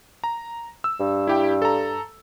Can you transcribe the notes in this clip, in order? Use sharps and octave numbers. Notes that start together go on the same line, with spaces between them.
A#5
E6
G2
E4 G4 G5
A4 A#5